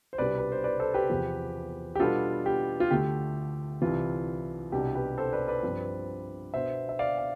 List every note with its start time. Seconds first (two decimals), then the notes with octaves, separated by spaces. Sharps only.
0.13 C5
0.18 C2 B2 G3 D4 B4 D5
0.38 B4
0.52 C5
0.64 B4 D5
0.79 A4 C5
0.94 G4 B4
1.10 E2 C3 F3
1.95 G4
2.00 B2 G3 B3 D4 F4 A4
2.46 G4
2.80 F4
2.91 D2 D3 A3 G4
3.82 C2 C3 E3 F4
4.72 C2 B2 B3 D4 G4
4.95 G4 B4
5.18 A4 C5
5.33 B4 D5
5.48 B4 D5
5.63 G2 F3 C4
6.53 B2 B3 D4 C5 E5
6.89 E5
6.99 D5 F5
7.18 F5